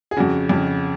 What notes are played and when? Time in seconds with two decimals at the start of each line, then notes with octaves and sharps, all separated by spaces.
0.11 G#4
0.16 F2 C#3 F#4
0.49 F2 C#3